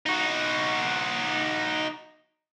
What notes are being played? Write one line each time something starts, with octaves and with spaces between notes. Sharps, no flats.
D#4 F#4